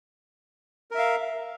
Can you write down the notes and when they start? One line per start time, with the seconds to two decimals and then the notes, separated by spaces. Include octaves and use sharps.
0.91 A#4
0.95 E5
0.99 F5